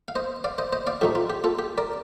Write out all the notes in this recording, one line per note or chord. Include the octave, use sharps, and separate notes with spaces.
F5
C5 D#5
D5 F5
C5 D#5
C5 D#5
D5 F5
A2 F3 A3 D#4 G4
F4
G4
F4 A4
G4
A#4 D5